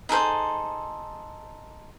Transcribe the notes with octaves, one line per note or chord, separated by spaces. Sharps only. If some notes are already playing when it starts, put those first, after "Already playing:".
D#4 G#4 A4 C5